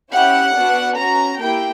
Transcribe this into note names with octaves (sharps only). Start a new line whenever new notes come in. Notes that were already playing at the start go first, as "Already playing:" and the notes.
C#4 E4 G4 F#5
B3 D4 F#4
C#4 F#4 A#5
A#3 E4 G4 G5